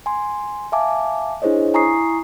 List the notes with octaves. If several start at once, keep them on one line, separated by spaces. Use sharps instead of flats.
G#5 C6
E5 F5 G#5 A5 D6
D4 E4 G#4 C5 C#5 D#5
E4 G#5 A#5 C#6 D#6 C7